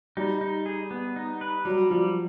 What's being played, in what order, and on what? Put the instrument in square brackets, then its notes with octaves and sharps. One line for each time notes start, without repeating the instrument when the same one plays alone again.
[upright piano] G3 [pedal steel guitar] D#4
[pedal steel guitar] D#4
G#4
B3
D#4
B4
[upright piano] F#3 [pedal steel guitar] G3
[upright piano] F3 [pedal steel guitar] G3